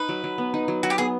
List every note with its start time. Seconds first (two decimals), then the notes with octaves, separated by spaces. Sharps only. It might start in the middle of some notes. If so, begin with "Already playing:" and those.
Already playing: D#4 B4
0.09 F#3
0.24 F#3
0.38 B3
0.54 D#4
0.68 F#3
0.83 F#3 F#4
0.90 G4
0.98 B3 G#4